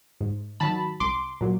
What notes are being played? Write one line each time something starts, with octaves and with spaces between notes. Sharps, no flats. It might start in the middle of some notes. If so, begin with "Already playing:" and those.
G#2
D#3 F#3 A5 B5
C2 C6 D6
A#2 F#3